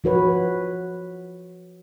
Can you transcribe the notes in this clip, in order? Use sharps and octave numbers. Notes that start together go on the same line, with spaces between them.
F3 F#4 B4 C#5